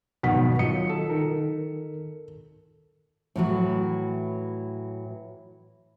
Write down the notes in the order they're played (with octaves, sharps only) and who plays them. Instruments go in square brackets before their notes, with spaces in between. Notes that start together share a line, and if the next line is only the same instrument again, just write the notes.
[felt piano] B1 F#5 B6 [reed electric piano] F2 G#2 [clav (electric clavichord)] B2 D#3
[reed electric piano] D#3 F#3 F4 [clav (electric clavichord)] D#5 [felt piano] C#7
[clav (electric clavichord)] A4
[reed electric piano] D#3 D#4 A#4
[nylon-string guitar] A2 E3 F#3